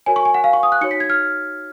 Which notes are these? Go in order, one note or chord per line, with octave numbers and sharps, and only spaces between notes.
F#4 A#4 C#5 G#5
C#6
G#5
F#5
F5
C#6
D#6
F#6
D#4 F#4 C#5 C#7
B6
G#6
F6